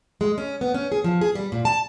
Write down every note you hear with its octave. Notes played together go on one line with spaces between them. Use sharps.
G#3
C#4
B3
C#4
G#4
F3
G#4
G3
A#2
A5